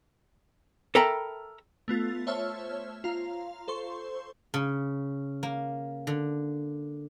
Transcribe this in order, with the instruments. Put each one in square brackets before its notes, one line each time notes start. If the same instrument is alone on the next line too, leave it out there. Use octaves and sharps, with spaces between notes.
[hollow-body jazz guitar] A4 A#4 E5 G5 A#5 B5
[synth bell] A3 B3 F4 A6
C5 C#5 E5 A5 E6 F6
F4 F5 A#5
A4 C5 C6 C#6
[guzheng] C#3
A#3
D3